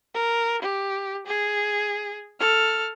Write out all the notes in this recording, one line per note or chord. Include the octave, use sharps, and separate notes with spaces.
A#4
G4
G#4
A4 F6